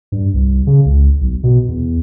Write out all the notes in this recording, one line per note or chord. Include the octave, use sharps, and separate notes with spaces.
G2
C2
C#3
C#2
B1
B2
E2